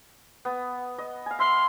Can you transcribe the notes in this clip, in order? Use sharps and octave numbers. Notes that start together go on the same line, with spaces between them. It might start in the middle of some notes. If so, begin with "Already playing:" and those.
B3
D#5
F5 G#5
E5 F5 C6